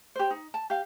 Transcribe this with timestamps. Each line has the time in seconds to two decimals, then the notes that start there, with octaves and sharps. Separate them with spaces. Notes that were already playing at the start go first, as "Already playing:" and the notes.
0.16 G4 C5
0.31 D#4
0.54 A5
0.70 G4 F5